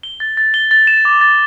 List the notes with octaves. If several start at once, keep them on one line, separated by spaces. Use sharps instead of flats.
G7
A6
A6
G7
A6
E7
D6
A6